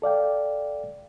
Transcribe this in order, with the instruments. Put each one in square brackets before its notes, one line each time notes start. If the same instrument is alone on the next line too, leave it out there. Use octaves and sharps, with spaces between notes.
[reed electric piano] A4 D5 F5 G5